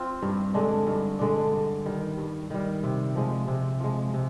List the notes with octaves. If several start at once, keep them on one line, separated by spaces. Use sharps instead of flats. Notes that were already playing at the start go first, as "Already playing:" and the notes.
Already playing: C4 F4
G2
D3 G#3 D4
G2
D3 G#3 D4
G2
D#3 G3
G2
D#3 G3
C3
F3 G#3
C3
F3 G#3
C3